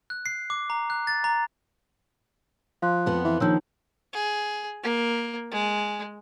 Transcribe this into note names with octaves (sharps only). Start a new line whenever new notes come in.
F#6
C7
D6
A#5
F#6
A6
A#5
F3 F5 C6 F#6
F2 B3 F#5
E3
A#1 D#3 F3 C#5 E6 G6
G#4
A#3
G#3